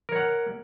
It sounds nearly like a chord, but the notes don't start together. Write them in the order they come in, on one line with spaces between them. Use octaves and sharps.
A#4 C#5 F#5